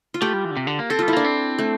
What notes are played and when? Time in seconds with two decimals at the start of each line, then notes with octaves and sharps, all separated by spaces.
0.14 F4
0.22 A3 G4
0.33 G3
0.45 E3
0.51 D3
0.57 C3
0.67 D3
0.79 A#3
0.90 C4 A4
0.99 G3 F4
1.08 E4
1.13 A#3 D4
1.25 C4
1.59 A3